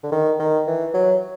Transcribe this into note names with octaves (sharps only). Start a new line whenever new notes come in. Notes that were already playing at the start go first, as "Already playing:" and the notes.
D3
D#3
D#3
E3
F#3